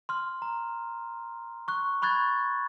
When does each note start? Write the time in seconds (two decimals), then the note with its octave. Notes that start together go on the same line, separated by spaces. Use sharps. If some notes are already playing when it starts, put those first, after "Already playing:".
0.09 C6 F6
0.42 A#5
1.68 C#6 F#6
2.02 B5 C#6 F#6 G#6 A6